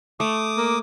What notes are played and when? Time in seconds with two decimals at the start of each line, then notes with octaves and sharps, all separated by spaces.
0.20 A3 D6 D#6
0.57 A#3